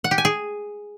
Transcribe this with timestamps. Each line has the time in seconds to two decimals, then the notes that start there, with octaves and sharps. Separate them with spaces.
0.04 F#5
0.11 G4
0.18 G#5
0.25 G#4